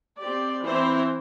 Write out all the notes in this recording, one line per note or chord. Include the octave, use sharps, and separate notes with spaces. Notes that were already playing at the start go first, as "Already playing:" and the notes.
C4 G4 D5
E3 C4 E4 C5